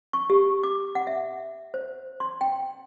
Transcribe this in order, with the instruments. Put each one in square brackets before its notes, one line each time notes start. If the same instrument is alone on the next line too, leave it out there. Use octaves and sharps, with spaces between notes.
[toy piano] C#6
G4
D6
F#5
E5
C5
C6
G5